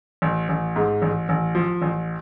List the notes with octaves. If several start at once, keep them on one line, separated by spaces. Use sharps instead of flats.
A1
A1
G#2
A1
A1
F3
A1